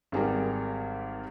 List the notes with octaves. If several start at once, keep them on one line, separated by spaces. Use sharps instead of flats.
G#1 G3 G#4 A#4